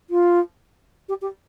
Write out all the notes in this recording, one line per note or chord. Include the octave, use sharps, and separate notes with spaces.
F4
G4
G4